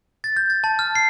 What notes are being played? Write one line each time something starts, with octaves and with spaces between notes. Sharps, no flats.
A6
G6
A6
A5
F6
C7